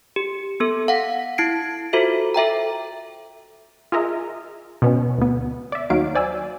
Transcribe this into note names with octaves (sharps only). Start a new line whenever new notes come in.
G4
B3 A4
F5 F#5 B6
E4 G#6 C7 D7
F4 F#4 A4 C5 E5
A4 E5 G5 A#5
F4 G#4 A#4 D#5 E5
B2 B3 C#4
D2 B3
D5 E5
D#2 F#3 D#4 F5 D7
C5 D5 G#5 E6